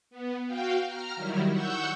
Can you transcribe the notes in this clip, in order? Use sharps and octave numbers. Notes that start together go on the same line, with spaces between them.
B3
F#4 F5 G5
A#5 F6
D#3 F#3 G3 E4
F#5 C#6 E6 G6